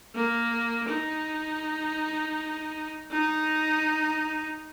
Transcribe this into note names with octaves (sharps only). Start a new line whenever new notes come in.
A#3
D#4
D#4